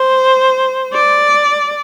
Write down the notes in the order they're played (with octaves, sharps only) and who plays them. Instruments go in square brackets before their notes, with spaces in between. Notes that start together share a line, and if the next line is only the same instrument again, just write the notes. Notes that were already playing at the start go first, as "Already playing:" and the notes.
Already playing: [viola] C5
D5